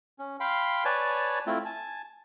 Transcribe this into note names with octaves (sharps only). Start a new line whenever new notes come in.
C#4
F5 G5 B5 C6
B4 C#5 D5 G#5 A5
A3 C4 E4 F4
G#5 A5